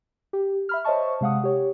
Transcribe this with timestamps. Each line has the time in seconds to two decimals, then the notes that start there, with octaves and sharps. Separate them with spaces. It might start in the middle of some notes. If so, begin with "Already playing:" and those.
0.33 G4
0.69 E5 B5 F6
0.84 C5 C#5 D#5 E5 A5 C#6
1.21 C3 G#3 F5 F#5 D#6
1.44 G4 C#5